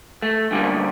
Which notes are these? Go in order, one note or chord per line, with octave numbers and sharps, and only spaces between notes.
A3
F#2 D3 E3 G3 A#3